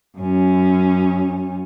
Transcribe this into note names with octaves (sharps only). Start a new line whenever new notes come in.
F#2 C#4